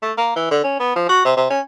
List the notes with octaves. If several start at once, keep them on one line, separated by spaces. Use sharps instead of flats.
A3
A#3
E3
D3
C#4
B3
F3
F#4
C3
C3
C#4